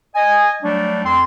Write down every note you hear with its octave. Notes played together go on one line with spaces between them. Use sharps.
D#5 G#5
F#3 G3 A3 D4
F2 C4 C6